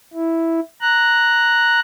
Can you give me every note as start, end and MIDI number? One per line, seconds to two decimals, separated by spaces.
0.13 0.60 64
0.81 1.80 82
0.81 1.80 90